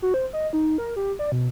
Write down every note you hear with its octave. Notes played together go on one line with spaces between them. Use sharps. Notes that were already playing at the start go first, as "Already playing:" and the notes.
F#4
C5
D#5
D#4
A#4
G4
D5
B2